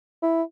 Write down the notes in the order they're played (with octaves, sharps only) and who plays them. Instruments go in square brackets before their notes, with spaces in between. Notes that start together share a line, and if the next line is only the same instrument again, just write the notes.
[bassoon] E4